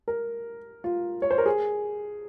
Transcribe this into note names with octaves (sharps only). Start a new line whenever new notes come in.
A#4
F4
C#5
C5
A#4
G#4